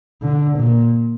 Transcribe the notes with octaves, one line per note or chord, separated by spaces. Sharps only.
D3
A#2